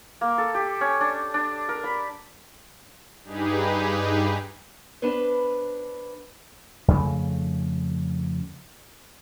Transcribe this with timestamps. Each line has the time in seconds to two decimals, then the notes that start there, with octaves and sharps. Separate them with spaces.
0.21 A#3
0.38 A4
0.55 G4
0.81 C#4
1.01 D4
1.34 D4
1.69 A#4
1.84 B5
3.23 G2 D#4 G4 G#4 B4
5.02 B3 D4 B4 C5
6.88 F2 C#3 A3